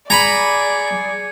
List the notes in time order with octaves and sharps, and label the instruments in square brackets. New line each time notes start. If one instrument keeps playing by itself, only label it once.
[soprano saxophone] G#4 [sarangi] D5 [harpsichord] A#5 B5 [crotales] G#6 C#7 D#7